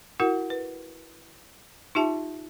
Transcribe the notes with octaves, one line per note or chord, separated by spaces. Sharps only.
E4 F#4 A#4 F#5
B4
D#4 F4 G4 E5 A5